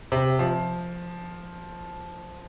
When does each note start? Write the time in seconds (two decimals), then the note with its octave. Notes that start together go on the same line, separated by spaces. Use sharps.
0.12 C3
0.39 F3